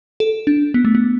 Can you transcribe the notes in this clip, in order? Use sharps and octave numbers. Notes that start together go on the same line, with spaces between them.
A4
D4
B3
A3
B3